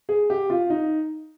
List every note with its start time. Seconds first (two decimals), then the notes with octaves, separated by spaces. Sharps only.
0.09 G#4
0.30 G4
0.50 F4
0.70 D#4